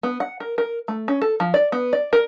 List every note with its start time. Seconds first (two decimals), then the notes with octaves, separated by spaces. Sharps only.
0.03 B3
0.20 F#5
0.40 A#4
0.58 A#4
0.88 A3
1.08 C#4
1.22 A4
1.40 F3
1.54 D5
1.72 B3
1.93 D5
2.13 A#4